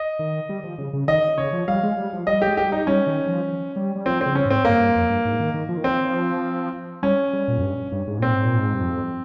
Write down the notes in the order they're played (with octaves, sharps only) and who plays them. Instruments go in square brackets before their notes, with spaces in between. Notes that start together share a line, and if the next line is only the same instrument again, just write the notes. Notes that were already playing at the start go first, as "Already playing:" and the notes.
Already playing: [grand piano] D#5
[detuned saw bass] D#3
G3
F3
C#3
C#3
[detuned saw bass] D#3 [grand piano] D#5
[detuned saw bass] C#3 [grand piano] C#5
[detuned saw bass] F3
[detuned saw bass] G3 [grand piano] F5
[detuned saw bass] G#3
G3
F3
[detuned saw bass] G3 [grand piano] D#5
[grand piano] G4
[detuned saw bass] G#3
[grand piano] G4
[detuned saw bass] G3
[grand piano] D#4
[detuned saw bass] G3 [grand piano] C#4
[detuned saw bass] D#3
F3
G3
G3
[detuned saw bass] F3 [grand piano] C4
[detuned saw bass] C#3 [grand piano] C4
[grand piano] C#4
[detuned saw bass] G#2 [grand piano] C4
[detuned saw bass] G2 [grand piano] A#3
[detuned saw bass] G2
F2
G2
G#2
D#3
D#3
F3
D#3
[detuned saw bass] F3 [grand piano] C4
[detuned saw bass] G3 [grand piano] C#4
[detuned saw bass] G3
A#2
F2
G2
G2
G#2
[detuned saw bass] A#2 [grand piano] C4
[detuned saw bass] G#2
A#2
G#2
G2
F2